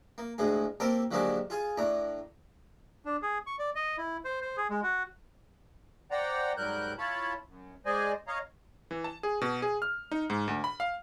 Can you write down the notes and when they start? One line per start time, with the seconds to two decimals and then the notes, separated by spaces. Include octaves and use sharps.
0.18 A#3
0.38 D2 A2 G#3 G#4
0.80 A#3 C4 G4 A4 A#4 C5
1.11 D3 F3 F#3 G#3 A#3 G4
1.50 F4 G#4 G#5
1.78 A2 D4 A#5
3.05 D4
3.22 G#4
3.46 C#6
3.59 D5
3.75 D#5
3.98 E4
4.25 C5
4.41 C5
4.57 G#4
4.70 G#3
4.83 F#4
6.11 C5 D5 F#5 G5 A#5
6.57 G#2 F#3 G3 A#4 F#6 G6
6.98 E4 F4 C#5 A5 B5
7.48 F#2
7.86 G#3 G#4 C5 D5 D#5 G#5
8.27 C#5 D#5 F5 A#5
8.91 E3
9.04 A5
9.23 G#4
9.41 B2
9.62 G#4
9.82 F6
10.11 D#4
10.30 G#2
10.48 D2
10.64 B5
10.80 F5